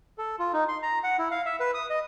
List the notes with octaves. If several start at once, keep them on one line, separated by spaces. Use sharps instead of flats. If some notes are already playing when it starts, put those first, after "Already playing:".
A4
F4
D#4
C6
A#5
F#5
E4
F5
E5
B4
D#6
D#5